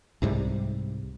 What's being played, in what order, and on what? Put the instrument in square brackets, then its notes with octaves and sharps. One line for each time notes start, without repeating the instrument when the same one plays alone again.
[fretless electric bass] C2 G#2 C3 G3